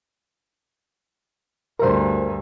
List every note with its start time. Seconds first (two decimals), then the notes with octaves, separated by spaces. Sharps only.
1.79 D2 G2 A#4 C5